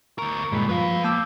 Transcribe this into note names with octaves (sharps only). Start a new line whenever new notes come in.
D2 A#4 C#6
G2 A#2 G#3 B5
F3 F4 B4 F5
A#3 G5 A5 D6 E6